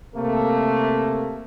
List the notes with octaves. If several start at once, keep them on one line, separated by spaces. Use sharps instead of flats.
C3 A3 A#3